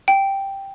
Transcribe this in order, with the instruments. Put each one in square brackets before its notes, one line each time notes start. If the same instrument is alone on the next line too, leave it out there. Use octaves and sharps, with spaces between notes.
[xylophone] G5